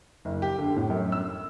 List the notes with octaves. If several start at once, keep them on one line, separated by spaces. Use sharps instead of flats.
F#1
G4
D3
A2
F#2
E6